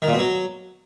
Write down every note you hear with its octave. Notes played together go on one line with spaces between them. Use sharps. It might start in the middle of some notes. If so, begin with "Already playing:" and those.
D#3
A#2
B2
F#3